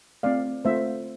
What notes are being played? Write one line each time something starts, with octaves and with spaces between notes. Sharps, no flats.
A3 C4 F4 D5 F5
A3 C4 F4 C5 E5